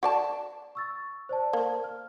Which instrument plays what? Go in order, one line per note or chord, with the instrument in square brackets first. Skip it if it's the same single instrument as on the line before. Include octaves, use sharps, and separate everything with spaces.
[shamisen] F#4 D5 A5
[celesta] C#6 E6 A6
C5 D5 A5
[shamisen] A#3
[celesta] F6